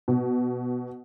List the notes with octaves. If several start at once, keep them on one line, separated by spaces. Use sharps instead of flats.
B2